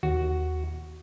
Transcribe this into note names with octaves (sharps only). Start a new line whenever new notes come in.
D#2 F#4